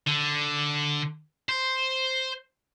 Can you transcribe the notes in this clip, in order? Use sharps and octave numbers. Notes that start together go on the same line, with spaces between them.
D3
C5